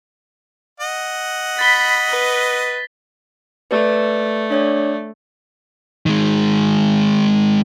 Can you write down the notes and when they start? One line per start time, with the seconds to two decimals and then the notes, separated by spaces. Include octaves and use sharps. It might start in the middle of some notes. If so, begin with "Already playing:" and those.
0.80 D#5 F#5
1.59 B5 A6 B6 G7
2.10 B4
3.71 A3 B4 D5
4.50 D4 C#5 D5
6.06 D#3 G#3